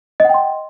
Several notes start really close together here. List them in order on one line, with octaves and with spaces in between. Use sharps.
D#5 F#5 G5 C6